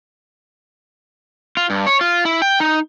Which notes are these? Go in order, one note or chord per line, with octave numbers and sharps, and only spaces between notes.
F4
G2
C#5
F4
E4
G5
D#4